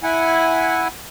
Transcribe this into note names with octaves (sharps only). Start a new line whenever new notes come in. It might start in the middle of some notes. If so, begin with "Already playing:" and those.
E4 F#5 G#5